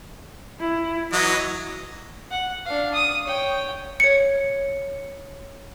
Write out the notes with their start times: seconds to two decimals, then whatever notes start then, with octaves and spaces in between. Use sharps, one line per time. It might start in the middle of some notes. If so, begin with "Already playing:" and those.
0.60 E4
1.13 E3 F#3 D#5
2.31 F#5
2.66 D4 F5
2.94 D#6
3.25 C#5 G5
4.00 C#5 C#7